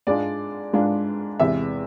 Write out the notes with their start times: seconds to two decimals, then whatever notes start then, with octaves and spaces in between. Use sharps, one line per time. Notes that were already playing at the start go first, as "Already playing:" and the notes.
0.07 G#2 G#3 D4 F4 D5
0.73 G#2 G#3 D4 F4
1.39 E2 C3 G#3 E5